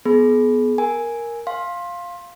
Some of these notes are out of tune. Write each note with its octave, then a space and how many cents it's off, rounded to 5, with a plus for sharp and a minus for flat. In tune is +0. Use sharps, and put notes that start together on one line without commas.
B3 +0 G#4 +35 B5 +0
A#4 +0 G#5 +0
F5 +0 C6 +20